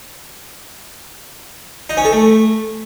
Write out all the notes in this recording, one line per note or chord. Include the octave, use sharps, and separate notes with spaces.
D#4
C#4
A4
A3